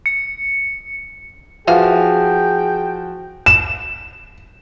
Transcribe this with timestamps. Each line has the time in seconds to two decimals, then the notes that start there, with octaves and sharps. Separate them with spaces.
0.06 C#7
1.67 E3 F3 F4 F#4 G#4 F5 G5
3.46 E7